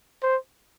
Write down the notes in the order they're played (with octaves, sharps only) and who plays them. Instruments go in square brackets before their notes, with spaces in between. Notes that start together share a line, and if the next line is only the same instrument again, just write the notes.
[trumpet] C5